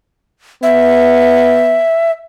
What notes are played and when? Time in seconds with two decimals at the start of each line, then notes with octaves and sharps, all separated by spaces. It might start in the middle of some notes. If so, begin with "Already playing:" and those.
0.63 B3 E5